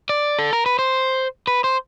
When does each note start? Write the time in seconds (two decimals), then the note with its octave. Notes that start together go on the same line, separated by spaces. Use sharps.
0.09 D5
0.39 A4
0.53 A#4
0.66 B4
0.79 C5
1.47 B4
1.64 C5